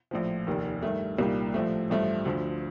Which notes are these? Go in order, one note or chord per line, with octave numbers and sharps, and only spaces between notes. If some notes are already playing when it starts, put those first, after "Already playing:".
A#1 A2 F3
F1 D#2 D#3
G2 D#3 A3
C2 A#2 G3 A#3 D#4
A#1 A2 F3 A3
A1 G2 F3 A3
D2 D3 F3